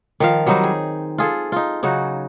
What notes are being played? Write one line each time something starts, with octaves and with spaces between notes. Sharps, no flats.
D#3 F3 F5
F#3 G3 C4 D#4
G#4
F4 G#4 A4
D#4 F4
C#3 F#3 D#4 F#4